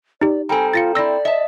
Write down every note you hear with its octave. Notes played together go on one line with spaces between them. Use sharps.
D#4 G4 D5
G3 C4 A4 G5 G#5 A#5
F4 A6 A#6 C#7
C4 E4 D5 E6 A#6
D#5 E5 A5